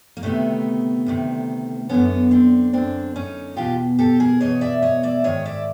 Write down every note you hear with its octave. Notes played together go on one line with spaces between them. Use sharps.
A#3
D2 C3 D#3 A3 B3
D2 C3 D#3
F#2 D3 B3 C#4
C4 D4
F#2 D3 C4 D4
C#4 D#4
E2 B2 F4 G4
G4 A4
G#4 A#4
E2 B2 C#5 D#5
D5 E5
C#5 D#5
D5 E5
G#2 D#3 C#5 D#5
D5 E5